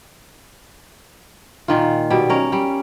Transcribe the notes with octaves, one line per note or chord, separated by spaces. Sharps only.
A#2 D#3 F4
B2 G3
C#4 A#4
G3